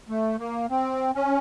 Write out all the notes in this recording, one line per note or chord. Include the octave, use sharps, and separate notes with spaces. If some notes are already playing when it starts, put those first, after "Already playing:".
A3
A#3
C4
C#4